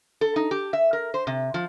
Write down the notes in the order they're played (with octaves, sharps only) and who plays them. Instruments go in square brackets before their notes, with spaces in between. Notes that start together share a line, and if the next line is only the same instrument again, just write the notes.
[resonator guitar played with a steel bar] A4
D#4
G4
E5
A#4
C5
C3
F3